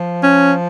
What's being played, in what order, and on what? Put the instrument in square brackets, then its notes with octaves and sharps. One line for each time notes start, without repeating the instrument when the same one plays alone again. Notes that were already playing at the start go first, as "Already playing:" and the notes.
Already playing: [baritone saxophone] F3
[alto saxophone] C#4